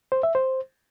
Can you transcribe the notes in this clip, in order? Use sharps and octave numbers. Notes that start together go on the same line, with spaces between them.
C5
E5
C5